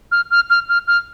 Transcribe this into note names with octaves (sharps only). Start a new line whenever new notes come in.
F6
F6
F6
F6
F6